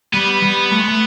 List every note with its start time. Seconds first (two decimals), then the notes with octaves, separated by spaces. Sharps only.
0.13 G3 B3
0.42 G3
0.71 A3
0.80 G#3
0.88 A3